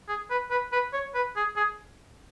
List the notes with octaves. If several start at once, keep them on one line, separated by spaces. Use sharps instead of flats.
G#4
B4
B4
B4
C#5
B4
G#4
G#4